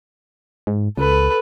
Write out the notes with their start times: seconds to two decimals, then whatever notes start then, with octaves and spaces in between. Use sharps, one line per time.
0.67 G#2
0.97 C#2 A4 B4